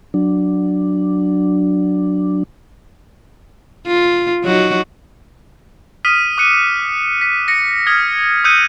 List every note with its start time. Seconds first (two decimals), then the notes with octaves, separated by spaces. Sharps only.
0.14 F#3 D4
3.87 F4
4.44 F#3 D#4 F#4
6.05 D#6 F6 B6 D#7
6.38 D6 F#6 C#7 D#7
7.21 B6
7.48 A#6 C#7
7.87 D#6 F6 G#6
8.44 D#6 E6 F#6 G6 C#7 D#7